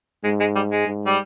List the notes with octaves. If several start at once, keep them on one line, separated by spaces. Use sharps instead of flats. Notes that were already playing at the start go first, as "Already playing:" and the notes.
G#2 G#3
G#3
G3
G#3
G#2
G3